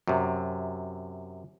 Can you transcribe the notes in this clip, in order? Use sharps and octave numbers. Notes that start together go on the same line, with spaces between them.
F#2 C3